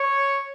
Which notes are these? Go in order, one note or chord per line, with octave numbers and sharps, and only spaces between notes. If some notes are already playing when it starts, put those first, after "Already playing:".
Already playing: C#5